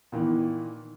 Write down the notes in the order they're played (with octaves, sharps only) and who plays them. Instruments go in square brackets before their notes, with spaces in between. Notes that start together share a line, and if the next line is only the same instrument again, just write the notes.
[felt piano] A#2 D#3 E3 B3